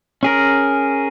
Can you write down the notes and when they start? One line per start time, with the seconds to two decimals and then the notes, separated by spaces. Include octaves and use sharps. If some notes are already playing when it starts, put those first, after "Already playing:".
0.23 C#4 G#4 A#4